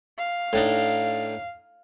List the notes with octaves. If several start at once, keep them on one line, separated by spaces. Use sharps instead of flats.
F5
A2 D4 D#4